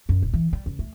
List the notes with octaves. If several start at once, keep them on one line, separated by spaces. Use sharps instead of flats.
F#2
D#1
E3
G3
C#2
A3